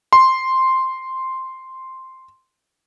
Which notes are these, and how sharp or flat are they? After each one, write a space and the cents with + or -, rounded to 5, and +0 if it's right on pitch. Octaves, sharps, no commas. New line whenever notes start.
C6 +0